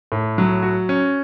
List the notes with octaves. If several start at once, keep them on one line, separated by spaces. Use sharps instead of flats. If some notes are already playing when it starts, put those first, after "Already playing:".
A2
F#3
F#4
C#4